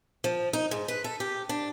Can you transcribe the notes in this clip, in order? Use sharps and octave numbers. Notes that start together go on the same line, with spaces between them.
F3
D#4
G#2
B4
A4
G4
D4